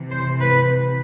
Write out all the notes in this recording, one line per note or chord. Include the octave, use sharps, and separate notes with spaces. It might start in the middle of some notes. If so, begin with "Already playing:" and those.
Already playing: C3 E3
C5
B4